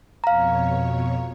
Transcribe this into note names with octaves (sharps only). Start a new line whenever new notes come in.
F2 B2 C#5 F5 A#5